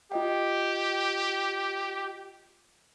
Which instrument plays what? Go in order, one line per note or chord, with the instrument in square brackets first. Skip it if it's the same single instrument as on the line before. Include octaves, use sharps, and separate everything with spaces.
[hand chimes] F4 D#5 G5 [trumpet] G4